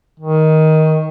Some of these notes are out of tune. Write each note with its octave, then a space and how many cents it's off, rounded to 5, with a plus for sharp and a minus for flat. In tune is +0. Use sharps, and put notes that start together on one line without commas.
D#3 +15